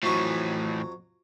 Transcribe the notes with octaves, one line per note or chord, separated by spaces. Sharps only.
F2 A2 E3 F#3 C#6